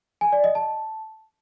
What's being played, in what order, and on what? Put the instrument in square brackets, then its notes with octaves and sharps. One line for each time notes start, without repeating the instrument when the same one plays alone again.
[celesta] G#5
D5
D#5
A5